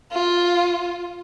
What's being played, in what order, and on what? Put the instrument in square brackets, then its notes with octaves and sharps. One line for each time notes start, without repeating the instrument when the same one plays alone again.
[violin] F4